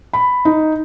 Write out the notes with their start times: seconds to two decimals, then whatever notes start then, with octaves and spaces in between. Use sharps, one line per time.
0.13 B5
0.45 D#4